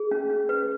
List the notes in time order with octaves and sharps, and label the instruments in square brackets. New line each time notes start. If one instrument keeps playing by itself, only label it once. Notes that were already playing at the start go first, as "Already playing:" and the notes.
Already playing: [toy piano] G#4
C#4
C#4
B4